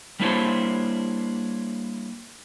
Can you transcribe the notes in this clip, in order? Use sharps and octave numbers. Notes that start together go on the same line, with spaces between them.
G3 A#3 D4 E4 C5 C#5